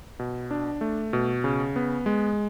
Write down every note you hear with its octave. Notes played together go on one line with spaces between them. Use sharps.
B2
D4
A3
B2
C#3
B3
G#3